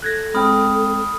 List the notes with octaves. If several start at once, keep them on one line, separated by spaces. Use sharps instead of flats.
A4 F#6 G#6 A#6
G#3 C4 G5 B5 D#6 F6